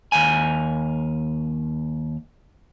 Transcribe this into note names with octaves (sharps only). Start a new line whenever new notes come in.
D#2 F5 G#5